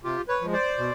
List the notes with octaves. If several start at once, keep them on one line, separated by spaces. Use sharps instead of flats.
C3 F4 G4
B4 C#5
F3 G#3
C5 D5
B2